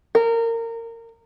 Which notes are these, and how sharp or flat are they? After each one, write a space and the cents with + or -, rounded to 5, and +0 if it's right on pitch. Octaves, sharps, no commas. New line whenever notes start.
A#4 -25